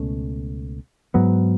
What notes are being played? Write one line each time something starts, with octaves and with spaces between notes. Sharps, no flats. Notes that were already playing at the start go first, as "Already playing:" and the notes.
Already playing: C#2 B2 A3 C#4
G#2 F#3 B3